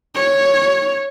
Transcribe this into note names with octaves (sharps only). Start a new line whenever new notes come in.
C#5